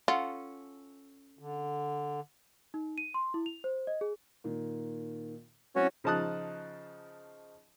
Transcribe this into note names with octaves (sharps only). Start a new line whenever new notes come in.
C#4 F4 A4 F#5
D3
D#4
D#7
C6
E4
F7
C5
D#5
G#4
A#2 D#3
F#3 C4 C#4 E4 F#4 C#5
C#3 F3 D#4 A5 D#6 F#6